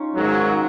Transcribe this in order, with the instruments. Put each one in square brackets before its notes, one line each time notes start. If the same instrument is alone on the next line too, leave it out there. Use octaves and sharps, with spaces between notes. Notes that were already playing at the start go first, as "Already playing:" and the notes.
Already playing: [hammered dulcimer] C#4 D#4 F4
[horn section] G#2 D#3 F#3